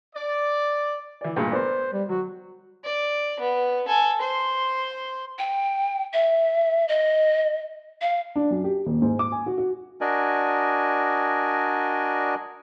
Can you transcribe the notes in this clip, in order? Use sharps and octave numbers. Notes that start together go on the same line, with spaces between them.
D5
E3 D5
G2 A#2 G#3
B3 A#4 C5 D5
G3
F#3 F#4
D5
B3
A4 G#5
C5 C6
G5
E5
D#5
F5
D4
F#2
G4
D#1
G#2
D6
G#5
F#4
F#4
D4 F#4 A#4 D5 D#5 G#5